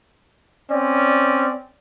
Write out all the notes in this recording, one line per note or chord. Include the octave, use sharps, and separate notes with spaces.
C4 C#4 D5